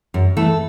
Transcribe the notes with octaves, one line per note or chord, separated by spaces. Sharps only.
F#2
E3 A3 A4